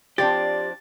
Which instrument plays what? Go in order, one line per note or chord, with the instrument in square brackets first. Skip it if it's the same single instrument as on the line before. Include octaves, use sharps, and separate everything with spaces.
[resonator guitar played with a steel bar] F3 C4 D4 [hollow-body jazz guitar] G4 [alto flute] D5 [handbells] A6